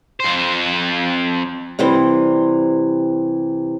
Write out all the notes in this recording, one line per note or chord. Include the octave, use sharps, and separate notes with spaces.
F2 C5
C3 E3 G3 C5